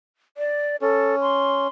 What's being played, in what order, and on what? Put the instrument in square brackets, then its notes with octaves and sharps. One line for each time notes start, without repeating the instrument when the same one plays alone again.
[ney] D5
[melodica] C#4 [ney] A4
[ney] C6